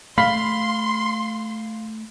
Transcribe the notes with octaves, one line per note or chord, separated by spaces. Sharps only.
A3 F5 B5 C6 B6